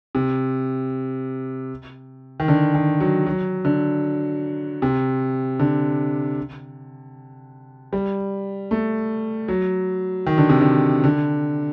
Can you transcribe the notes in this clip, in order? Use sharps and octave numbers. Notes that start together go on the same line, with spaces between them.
C3
D#3
D3
D#3
F#3
F#3
D3
C3
D3
G3
A3
F#3
D#3
D3
C3
D3
D3